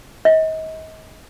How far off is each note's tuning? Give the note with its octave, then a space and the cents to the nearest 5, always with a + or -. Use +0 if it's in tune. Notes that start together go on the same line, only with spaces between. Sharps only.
D#5 +35